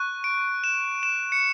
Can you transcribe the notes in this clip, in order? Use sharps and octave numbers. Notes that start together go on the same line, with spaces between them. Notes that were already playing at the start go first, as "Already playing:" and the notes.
Already playing: C#6 F#6
D7
E7
E7
C#7